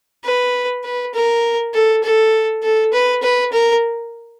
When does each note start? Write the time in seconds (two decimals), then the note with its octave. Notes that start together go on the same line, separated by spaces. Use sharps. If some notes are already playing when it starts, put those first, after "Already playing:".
0.24 B4
0.84 B4
1.14 A#4
1.74 A4
2.03 A4
2.63 A4
2.93 B4
3.23 B4
3.52 A#4